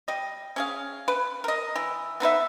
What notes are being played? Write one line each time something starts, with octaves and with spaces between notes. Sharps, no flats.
G3 D#5
C#4 G#4 F5
B4
A#4 D#5
E3
B3 D#4 B4 E5